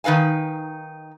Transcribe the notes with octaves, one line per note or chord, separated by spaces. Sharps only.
D#3 D#4 B4 F5 G#5